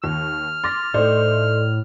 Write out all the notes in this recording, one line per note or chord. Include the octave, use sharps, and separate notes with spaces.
D#2 F6
C6 D6 A6 A#6
A2 A3 D#4 A4 C5 D5